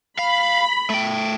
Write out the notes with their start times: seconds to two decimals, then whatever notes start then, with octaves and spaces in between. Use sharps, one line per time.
0.19 F5 B5
0.90 A3 G5